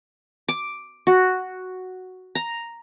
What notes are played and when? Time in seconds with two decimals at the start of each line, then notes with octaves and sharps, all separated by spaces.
0.49 D6
1.07 F#4
2.35 A#5